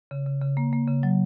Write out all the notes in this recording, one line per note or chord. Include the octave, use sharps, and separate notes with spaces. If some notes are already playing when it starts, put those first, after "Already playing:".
C#3
C#3
C#3
A#3
A#3
C#3
F#3